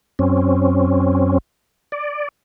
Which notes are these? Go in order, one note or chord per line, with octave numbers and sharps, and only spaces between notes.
F#2 C4 C#4
D5